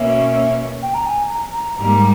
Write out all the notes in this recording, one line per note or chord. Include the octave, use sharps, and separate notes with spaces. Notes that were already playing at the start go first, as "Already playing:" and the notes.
Already playing: B2 A#3 C#4 E5
G5
A#5
G#5
A#5
A#5
G#2 G3 A#3 A#5